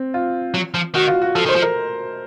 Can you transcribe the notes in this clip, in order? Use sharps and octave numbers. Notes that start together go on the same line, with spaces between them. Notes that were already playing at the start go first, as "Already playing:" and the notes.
Already playing: C4
F4
F#3
F3
D#3 F#4
F4
F#4
F3 A4
D#3 C5
F3
A#4